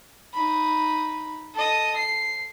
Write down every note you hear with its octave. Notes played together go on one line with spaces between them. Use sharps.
D#4 B5
A4 D#5
C7